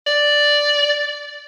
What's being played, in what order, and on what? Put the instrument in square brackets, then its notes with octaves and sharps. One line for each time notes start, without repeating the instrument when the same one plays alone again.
[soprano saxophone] D5